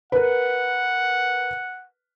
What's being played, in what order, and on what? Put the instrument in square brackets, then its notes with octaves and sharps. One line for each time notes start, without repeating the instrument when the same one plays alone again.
[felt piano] A#4 B4 [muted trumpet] F#5